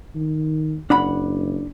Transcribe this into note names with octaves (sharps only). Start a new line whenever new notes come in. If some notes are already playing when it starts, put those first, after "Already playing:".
D#3
F#1 D4 F#5 B5